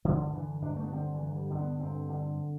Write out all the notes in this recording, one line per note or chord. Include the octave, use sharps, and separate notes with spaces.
G2 D3
D3 E3
G2 D4
A3
B3
D3 C4
E3
G2
G3
D3 C4
B3
G2 C4
D3